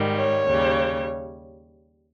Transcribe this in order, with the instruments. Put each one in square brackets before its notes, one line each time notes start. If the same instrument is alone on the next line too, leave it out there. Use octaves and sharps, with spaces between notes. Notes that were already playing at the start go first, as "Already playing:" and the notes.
Already playing: [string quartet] G#2 D#3 G3
C#5
D#2 C#3 G3